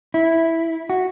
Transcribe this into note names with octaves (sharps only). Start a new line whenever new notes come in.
E4
F#4